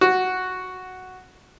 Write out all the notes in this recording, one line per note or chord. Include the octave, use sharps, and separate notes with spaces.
F#4